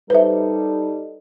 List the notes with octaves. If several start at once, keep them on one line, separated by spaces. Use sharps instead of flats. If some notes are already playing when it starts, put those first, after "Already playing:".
G3 D#4 A4 B4 C5 E5